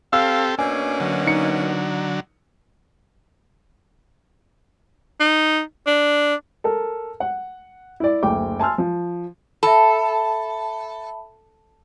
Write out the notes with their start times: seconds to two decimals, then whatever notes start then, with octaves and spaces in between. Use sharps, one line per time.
0.13 C4 G4 A4 F5 E6
0.59 B2 A#3 C#4 D4 G#5
1.00 D3 F#3
1.27 D#4 C#7
5.20 D#4
5.87 D4
6.64 A4 A#4
7.20 F#5
8.00 E4 D5
8.23 F#1 D2 G5 D6
8.60 G#5 A5 C6 E6 F6
8.78 F3
9.63 A4 E5 A5 B5